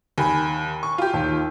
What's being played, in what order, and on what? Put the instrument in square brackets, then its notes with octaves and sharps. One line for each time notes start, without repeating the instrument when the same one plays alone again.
[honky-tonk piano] D#2 [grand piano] G#5 B5
[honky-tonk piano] C#6
F4 G4
[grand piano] D#2